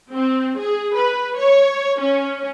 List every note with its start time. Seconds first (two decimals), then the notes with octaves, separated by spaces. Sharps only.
0.13 C4
0.57 G#4
0.95 B4
1.38 C#5
2.00 C#4